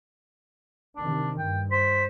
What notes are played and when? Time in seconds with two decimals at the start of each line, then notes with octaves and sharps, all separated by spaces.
0.96 C3 D#3 D4
1.38 G2 G5
1.71 C5 B6